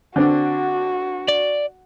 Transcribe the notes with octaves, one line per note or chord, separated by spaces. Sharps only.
D3 C4 D4 F#4
D5